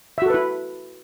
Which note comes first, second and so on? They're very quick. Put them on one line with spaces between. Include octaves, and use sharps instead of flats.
E5 F#4 A4 B4 E4